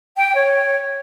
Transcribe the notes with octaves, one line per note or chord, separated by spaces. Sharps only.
G5
C#5